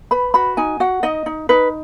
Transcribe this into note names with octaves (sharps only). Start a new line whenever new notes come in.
B4 B5
F#4 B5
D#4 G#5
F#4 F#5
D#4 D#5
D#4
D#4 B4